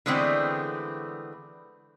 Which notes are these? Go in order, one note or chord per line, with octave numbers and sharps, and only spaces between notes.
D3 E3 G#3 A3 B3 C4